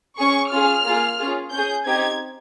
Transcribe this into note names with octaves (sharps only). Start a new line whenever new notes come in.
C#4 G#4 C#6
C#4 F4 G#4 F6
A#3 F4 G#4
C#4 F4 G#4
C#4 G#4 G6
C4 D#4 G4 G#6